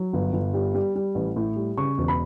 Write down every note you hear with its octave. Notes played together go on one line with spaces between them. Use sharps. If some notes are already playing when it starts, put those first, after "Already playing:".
Already playing: F#3
G1
G1
G3
G3
G3
A1
A2
G3
C#3 C#6
E1
B5